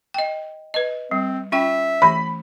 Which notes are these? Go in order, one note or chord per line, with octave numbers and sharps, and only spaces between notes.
D#5 G5
B4 D#5
G3 C4
C#4 F4 E5 G5
E3 A3 B5